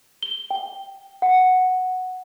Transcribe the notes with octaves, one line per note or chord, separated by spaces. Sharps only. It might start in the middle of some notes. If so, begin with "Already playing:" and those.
G7
G5
F#5